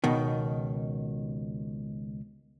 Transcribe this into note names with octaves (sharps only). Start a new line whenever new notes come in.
C#2 B2 D#3